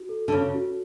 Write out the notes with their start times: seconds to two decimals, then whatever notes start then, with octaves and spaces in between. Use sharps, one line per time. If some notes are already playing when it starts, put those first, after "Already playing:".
Already playing: F#4
0.09 A4
0.28 D3
0.32 C#3 C#5
0.55 F#4